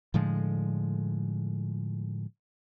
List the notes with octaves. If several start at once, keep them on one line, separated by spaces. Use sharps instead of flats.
A2 D3 F3 G#3